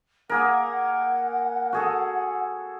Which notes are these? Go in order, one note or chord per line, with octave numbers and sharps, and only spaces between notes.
A#3 G#4 A#4 F#5
F#4 G#4 A4